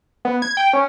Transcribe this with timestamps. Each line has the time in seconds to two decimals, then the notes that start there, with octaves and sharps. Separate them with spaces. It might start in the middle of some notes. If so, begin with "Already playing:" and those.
0.25 B3
0.42 G#6
0.57 G5
0.73 C#4